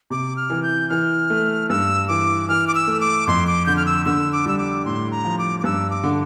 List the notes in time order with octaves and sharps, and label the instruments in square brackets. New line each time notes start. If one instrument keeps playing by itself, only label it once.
[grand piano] C3 [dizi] D6
[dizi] F6
[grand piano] E3
[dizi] G6
[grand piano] E3 [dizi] F6
[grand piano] A3
[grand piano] G2 [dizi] E6
[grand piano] E3 [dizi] D6
[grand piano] E3 [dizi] F6
[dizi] D6
E6
[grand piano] A3
[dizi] D6
[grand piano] F2 [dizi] C6
[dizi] D6
[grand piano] D3 [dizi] G6
[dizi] F6
E6
[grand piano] D3 [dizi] E6
[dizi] D6
[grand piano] G3 [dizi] E6
[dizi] D6
[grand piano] A2 [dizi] C6
[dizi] A#5
[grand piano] F3
[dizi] D6
D6
[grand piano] G2 [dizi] E6
[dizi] D6
[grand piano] D3